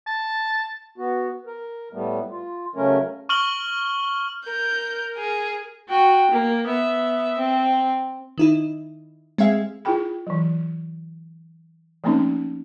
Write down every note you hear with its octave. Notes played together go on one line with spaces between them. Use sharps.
A5
B3 F#4
A#4
A2 G3 A3 B3
F4
C#3 F#3 A3 C#4 A#4
C#6 F6 F#7 G7
A#4 G6
G#4
F#4 G5
A#3
B3 E5
C4
D#3 D#4 E4
G#3 C4 G#4 E5 F5
E4 F4 G#4 G5 B5
E3 F#3
F3 A3 A#3 C4 C#4 D#4